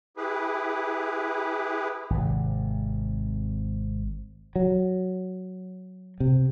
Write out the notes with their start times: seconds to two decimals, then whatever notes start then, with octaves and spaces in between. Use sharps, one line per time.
0.17 E4 G4 G#4 B4
2.10 G#1 C3
4.56 F#3
6.20 C3